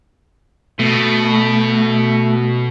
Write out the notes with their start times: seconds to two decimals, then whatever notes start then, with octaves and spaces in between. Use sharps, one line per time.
0.79 B2 A3